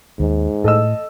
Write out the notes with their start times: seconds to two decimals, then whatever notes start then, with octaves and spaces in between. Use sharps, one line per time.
0.20 D#2 G#2
0.64 A2 A4 D#5 E6